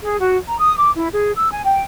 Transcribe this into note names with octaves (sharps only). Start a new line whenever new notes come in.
G#4
F#4
A#5
D#6
D6
E4
G#4
E6
G#5
G5